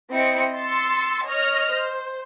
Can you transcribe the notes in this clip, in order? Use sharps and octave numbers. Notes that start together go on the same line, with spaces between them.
C4 E4 D#5 C#7
C6 E6 A6 C#7
C#5 D#5 F6 A#6
C5